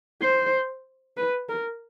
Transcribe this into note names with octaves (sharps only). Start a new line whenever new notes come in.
C5
B4
A#4